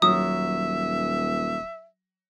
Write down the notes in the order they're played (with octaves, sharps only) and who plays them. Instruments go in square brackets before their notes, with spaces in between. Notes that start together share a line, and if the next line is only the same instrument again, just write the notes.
[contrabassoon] D#1 [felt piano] F#3 [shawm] E5 [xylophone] D#6